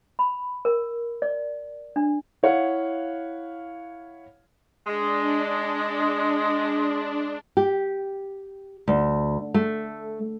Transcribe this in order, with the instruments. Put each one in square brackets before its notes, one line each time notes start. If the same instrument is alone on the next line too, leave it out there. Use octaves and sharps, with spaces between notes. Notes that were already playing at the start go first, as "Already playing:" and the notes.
[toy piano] B5
A#4
D5
D4
[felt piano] E4 C#5 F5 F#5
[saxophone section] G#3 [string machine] D4
[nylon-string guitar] G4
D2
A3